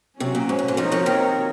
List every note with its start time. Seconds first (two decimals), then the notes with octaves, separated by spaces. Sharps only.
0.20 C3 F#3 C#4 F#4
0.35 A#2
0.49 G#2
0.59 F#2
0.68 G#2
0.77 F2 F3 C4 D#4 F#4 A#4 C#5
0.92 F2 F3
1.06 D#2 D#3